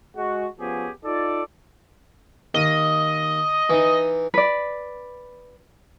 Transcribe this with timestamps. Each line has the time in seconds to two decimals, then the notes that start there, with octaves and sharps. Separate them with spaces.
0.17 G#3 F#4
0.60 F3 B3 C#4 G4 G#4
1.05 D#4 F4 A4 D5
2.54 D#2 D#5
3.70 E3 D#4
4.34 B4 D5